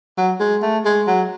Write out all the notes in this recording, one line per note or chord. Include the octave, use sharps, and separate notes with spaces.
F#3
G#3
A3
G#3
F#3